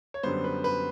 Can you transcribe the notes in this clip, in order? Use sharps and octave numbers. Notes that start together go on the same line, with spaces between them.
C#5
F#2 D3 G3 B3 C5
B4
B4